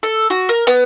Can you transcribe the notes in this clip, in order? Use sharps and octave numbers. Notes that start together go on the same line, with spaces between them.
A4
F#4
A#4
B3